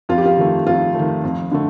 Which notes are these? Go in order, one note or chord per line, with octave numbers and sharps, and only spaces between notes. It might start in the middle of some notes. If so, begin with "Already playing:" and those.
F2 F4
G4
F4
D#3 A3
F2 F4
D#3 A3
F2
D3 A3